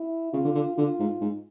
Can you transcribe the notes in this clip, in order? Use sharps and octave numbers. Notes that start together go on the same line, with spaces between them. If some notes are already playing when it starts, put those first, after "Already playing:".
Already playing: E4
C#3 F4
D3
D3
D3 F4
G#2
G#2